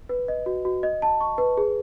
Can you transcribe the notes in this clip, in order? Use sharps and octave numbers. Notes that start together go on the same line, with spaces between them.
B4
D#5
F#4
F#4
D#5
A5
C#6
B4
G#4